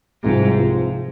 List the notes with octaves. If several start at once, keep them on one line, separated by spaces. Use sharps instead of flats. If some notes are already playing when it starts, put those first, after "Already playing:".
C2 G#2 C3 F3
C3 F3